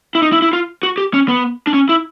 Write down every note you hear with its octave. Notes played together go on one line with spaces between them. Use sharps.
E4
D#4
E4
E4
F4
F#4
G4
C#4
B3
D4
C#4
E4